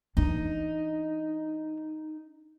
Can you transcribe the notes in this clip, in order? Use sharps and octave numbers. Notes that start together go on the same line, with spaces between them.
E3 D4 D#4